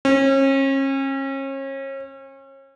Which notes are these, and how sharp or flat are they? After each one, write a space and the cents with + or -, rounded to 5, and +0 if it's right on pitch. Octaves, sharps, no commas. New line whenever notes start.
C#4 -35